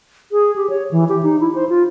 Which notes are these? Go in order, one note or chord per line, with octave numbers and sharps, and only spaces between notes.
G#4
G4
C#5
E3
G4
D#4
E4
C5
F4